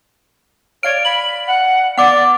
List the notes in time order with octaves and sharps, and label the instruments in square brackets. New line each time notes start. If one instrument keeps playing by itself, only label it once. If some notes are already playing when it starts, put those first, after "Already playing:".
[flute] C#5 [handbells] D5 F5 F6 [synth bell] D7
[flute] B5 [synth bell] F#7
[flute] F#5
[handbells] B3 [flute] D5 [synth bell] F#5 D6